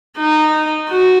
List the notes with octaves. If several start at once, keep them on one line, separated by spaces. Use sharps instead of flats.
D#4
F#4